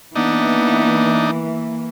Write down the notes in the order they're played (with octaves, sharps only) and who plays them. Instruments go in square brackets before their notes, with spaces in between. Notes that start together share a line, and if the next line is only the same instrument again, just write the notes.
[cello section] E3 A#3 [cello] B3 [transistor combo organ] D4 D#4